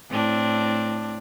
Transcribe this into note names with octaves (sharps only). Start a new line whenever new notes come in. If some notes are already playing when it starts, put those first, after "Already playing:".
A2 C4 D4